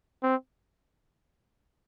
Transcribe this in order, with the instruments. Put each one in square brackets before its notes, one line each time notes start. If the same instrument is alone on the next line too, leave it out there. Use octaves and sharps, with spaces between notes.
[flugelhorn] C4